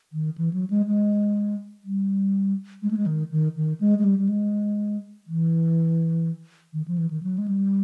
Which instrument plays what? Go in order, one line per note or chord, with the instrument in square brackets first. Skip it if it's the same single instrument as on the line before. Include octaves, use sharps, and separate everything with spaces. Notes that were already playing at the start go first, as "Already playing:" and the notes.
[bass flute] D#3
E3
F#3
G#3
G#3
G3
G#3
A3
G#3
D#3
D#3
D#3
G#3
G#3
G3
G3
G#3
E3
D#3
F3
E3
D#3
F#3
G#3
G3